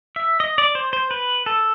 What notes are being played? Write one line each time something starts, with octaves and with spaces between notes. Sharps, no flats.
E5
D#5
D5
C5
C5
B4
A4